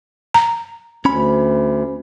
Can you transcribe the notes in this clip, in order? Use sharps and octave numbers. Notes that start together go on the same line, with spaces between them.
A#5
D2 C#4 B5